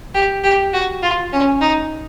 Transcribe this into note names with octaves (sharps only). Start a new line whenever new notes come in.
G4
G4
F#4
F4
C#4
D#4